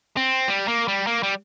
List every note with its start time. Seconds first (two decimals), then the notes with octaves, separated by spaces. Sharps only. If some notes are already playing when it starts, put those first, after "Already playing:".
0.17 C4
0.48 G3
0.68 A#3
0.88 G3
1.07 A#3
1.23 G3